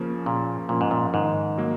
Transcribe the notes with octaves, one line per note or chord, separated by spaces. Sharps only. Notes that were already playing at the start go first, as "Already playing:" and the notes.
Already playing: C#3 F3 A#3 C#4
A#2 C#3
A#2 F3 A#3 C#4
G#2
A#2
G#2 D#3
F#3 A#3